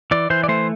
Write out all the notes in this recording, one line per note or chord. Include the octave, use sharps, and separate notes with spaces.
E3 D5
E3 C5
D5
A3 C5